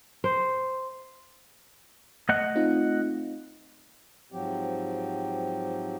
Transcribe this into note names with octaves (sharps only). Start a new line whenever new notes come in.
C5
A3 D#5 F#5
C4 D#4 F4
G#2 F3 F#3 C4 G4